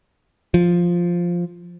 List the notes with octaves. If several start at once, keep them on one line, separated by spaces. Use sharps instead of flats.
F3